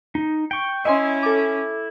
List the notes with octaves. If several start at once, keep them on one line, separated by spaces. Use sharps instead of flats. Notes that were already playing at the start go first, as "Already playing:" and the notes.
D#4
G5 C#6
C#4 E4 D#5 E5 G#5 C6
A4 D6